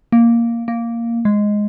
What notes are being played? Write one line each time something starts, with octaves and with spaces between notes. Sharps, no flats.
A#3
A#3
G#3